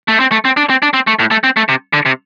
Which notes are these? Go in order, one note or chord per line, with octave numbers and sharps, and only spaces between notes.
A3
C4
A3
C4
D4
C4
D4
C4
A3
A2
A3
C4
A3
C3
D3
C3